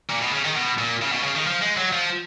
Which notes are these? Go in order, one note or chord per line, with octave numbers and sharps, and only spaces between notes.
A#2
B2
C#3
D#3
B2
A#2
C#3
B2
C#3
D#3
F3
G#3
F#3
F3